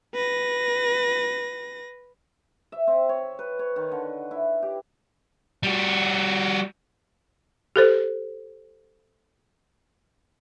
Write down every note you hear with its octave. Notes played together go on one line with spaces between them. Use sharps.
B4 A#6
E5
C4
C#5
B4
C#5
D#3
D3
E4
G4
G3 F#4
G4 A4 C5